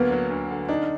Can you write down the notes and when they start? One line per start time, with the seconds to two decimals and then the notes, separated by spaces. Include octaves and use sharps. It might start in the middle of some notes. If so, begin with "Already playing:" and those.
Already playing: D2 D3 F#3 A#3 B3
0.12 F#3
0.30 D2
0.50 D3
0.69 D4 D#4